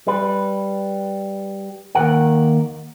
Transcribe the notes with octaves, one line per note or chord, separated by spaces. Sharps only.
G3 B4
D#2 C#3 A#4 F#5